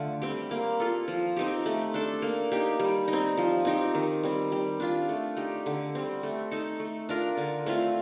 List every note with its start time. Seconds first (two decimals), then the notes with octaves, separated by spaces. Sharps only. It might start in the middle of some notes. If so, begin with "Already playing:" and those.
Already playing: D3 A3 F4
0.22 G3 C4 G4
0.51 A#3
0.80 F4 A4
1.08 F3
1.37 C4 D#4 G4
1.66 A3
1.94 D4 A4
2.22 A#3
2.52 D#4 G4
2.80 G3
3.08 D#4
3.13 C4
3.37 F3
3.65 C4 D#4 G4
3.95 D#3
4.23 G3 C4
4.52 G3
4.80 D4 F4
5.09 A3
5.37 D#4 G4
5.66 D3
5.95 G3 C4
6.23 A3
6.51 D#4 A4
6.80 A3
7.09 D4 F4 A#4
7.37 D3
7.66 A3 C4 F4